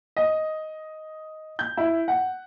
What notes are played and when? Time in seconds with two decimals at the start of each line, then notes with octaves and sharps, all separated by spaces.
0.17 D#5
1.59 G6
1.77 E4
2.08 F#5